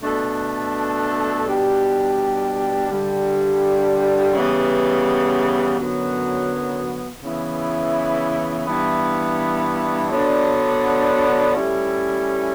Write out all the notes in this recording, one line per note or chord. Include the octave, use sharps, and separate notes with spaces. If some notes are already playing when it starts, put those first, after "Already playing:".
B2 A3 D4 A4
B2 G3 D4 G4
G2 D3 G3
C#3 E3 G3 B3
F#2 D3 F#3 B3
C#3 E3 B3 E4
G2 E3 B3 E4
D3 F#3 B3 D4
A2 G3 C#4 E4